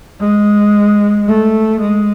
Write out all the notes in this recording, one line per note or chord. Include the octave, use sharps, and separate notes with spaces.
G#3
A3
G#3